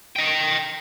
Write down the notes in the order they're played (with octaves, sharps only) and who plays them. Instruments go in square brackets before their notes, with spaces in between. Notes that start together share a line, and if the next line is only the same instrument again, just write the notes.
[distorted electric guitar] D#5 G5